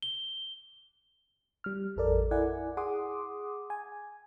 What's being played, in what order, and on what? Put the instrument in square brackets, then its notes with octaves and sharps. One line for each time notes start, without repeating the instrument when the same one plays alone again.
[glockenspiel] G7
[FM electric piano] G3 F6
A1 F2 A4 A#4 D5
E4 D5 F#5 G#5
G#4 F#5 C6 D6 D#6
G#5